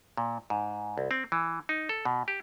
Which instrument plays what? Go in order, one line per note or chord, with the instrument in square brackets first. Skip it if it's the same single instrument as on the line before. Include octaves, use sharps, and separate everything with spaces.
[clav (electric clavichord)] A#2
G#2
C2
C4
E3
D#4
A4
B2
G4